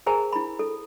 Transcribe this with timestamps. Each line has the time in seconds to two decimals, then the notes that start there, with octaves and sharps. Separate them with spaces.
0.06 G#4 A#4 C5 G#5 A#5
0.33 E4 B5
0.59 A4